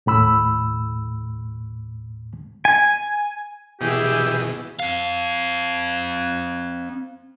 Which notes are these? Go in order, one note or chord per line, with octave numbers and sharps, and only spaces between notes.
D#2 A2 B5 E6
G#5
B2 E3 G4 G#4 E5
C4 F5